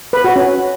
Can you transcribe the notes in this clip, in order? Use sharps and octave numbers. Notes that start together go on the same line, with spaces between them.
B4
F#4
C#4